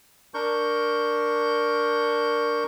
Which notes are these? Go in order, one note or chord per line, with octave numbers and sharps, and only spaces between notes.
D4 A#4 C#6 G6